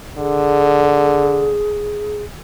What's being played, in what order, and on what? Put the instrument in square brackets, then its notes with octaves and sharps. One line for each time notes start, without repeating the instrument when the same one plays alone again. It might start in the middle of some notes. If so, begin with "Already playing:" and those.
[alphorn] D3 [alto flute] G#4